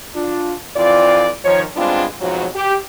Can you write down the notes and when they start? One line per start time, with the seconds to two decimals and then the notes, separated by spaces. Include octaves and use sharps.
0.14 D4 F4
0.76 F2 E3 C4 F4 D5
1.44 D#3 F3 C#5
1.77 G3 G#3 B3 C4 D4 F4
2.21 F2 G#2 B2 F3 F#3
2.56 G4